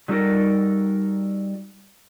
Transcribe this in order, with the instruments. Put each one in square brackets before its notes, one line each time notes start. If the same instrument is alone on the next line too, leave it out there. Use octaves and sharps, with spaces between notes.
[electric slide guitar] F#3 G3 D#4 F#4 A4 A#4